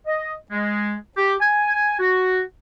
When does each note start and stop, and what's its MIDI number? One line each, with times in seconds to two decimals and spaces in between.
0.07 0.34 75
0.51 0.95 56
1.16 1.34 67
1.40 1.98 80
1.99 2.41 66